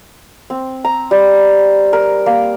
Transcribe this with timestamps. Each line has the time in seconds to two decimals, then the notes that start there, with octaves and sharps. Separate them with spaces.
0.50 C4
0.84 A#5
1.11 G3
1.93 A#4
2.26 A#3